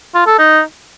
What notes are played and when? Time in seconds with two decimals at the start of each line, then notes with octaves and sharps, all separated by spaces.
0.15 F4
0.27 A4
0.39 D#4